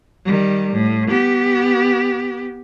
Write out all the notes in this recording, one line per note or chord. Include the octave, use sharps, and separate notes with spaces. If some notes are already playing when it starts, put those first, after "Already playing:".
D#3 G3
A2
B3 G4